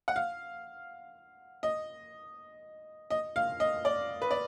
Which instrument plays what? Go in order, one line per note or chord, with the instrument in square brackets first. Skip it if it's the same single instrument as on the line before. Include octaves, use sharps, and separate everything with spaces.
[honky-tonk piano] F#5
F5
D#5
D#5
F5
D#5
D5
B4
D5